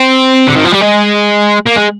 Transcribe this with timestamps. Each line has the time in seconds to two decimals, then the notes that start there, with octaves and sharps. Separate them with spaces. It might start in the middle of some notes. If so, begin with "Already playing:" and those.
Already playing: C4
0.48 D3
0.56 D#3
0.65 F3
0.72 G3
0.81 G#3
1.66 A#3
1.76 G#3